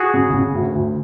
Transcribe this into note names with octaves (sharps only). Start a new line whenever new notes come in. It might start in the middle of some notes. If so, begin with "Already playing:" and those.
Already playing: F#4 G#4
C#3
C#3
D2
D2